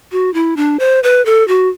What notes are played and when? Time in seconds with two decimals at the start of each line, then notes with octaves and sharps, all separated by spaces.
0.12 F#4
0.34 E4
0.57 D4
0.79 C5
1.03 B4
1.25 A4
1.48 F#4